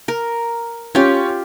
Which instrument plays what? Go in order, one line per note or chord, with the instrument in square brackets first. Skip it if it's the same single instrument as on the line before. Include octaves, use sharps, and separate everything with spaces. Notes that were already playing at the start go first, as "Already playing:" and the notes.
[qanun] A#4
[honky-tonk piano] C#4 C#5 [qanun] F4 G4